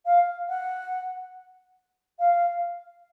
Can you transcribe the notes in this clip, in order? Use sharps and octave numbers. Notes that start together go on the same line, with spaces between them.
F5
F#5
F5